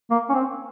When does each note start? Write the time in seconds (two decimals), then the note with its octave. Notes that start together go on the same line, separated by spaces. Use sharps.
0.10 A#3
0.29 C#4
0.34 C4